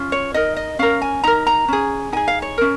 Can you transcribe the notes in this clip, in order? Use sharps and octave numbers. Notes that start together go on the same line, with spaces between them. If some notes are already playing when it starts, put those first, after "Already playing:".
Already playing: C#4 F4
C#5
D#4 A#4 D#5
D#5
C#4 A#4 F5
G#5
D#4 A#4 A#5
A#5
C#4 G#4
D#4 G#4 G#5
F5
C#5
C#4 A#4